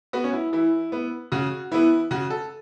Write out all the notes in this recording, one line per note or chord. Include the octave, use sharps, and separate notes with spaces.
B3 F#4
C#4
E4
E3 E4
B3
C#3 F#4
E3 B3 E4
C#3 F#4
A4